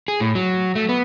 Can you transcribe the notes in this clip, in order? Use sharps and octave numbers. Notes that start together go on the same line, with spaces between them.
G#4
A2
F#3
A3
B3